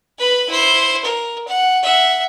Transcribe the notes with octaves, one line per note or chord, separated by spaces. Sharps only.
B4 B5
E4 C5
A#4
F#5
E5 F#5